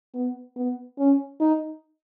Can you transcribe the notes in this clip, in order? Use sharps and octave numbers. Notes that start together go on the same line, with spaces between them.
B3
B3
C#4
D#4